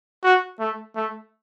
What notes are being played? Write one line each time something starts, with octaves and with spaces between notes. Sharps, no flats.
F#4
A3
A3